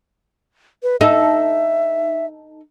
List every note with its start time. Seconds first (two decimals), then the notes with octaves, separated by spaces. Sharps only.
0.83 B4
1.01 D#4 A4 E5